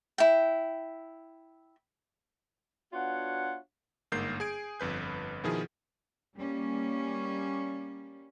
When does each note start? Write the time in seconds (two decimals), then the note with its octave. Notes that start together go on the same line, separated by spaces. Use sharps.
0.18 E4 G5
2.93 B3 D4 F4 F#4 C#5 F#5
4.12 G1 G#2 A#3 A#4 G6 C7
4.40 G#4 G#5 G#6 D7
4.80 G1 F2 B4 G6
5.44 B2 D#3 F3 E4 G#4
6.36 G3 A#3 C#4